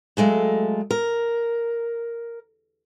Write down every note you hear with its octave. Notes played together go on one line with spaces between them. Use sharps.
F#3 G#3 A3 F5
A#4